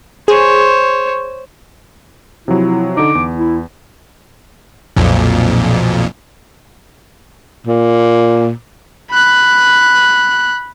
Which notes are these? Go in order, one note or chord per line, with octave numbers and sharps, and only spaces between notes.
G#4 C5 C#5
C3 F3 F#3 E4
D3 D#4 D6
E2
E4
B1 F2 A#2
A#2
B5 F#6